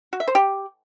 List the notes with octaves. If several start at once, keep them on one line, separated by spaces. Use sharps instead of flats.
F#4
E5
C5
G4